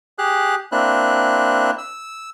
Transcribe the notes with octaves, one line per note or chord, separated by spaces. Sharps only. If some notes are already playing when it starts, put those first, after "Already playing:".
G4 G#4 F#6
A#3 C4 D4 E4 F#6
E6